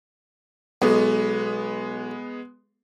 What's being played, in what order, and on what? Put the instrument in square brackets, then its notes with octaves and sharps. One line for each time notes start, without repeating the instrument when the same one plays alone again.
[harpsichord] B1 [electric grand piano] G#3 B3